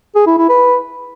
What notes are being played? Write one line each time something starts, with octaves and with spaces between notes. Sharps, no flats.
G#4
E4
E4
B4